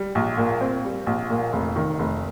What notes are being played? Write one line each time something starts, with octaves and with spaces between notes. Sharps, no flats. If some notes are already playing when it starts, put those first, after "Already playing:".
Already playing: G3
A#1
A#2
C4
G3
A#1
A#2
F1
D#3
F1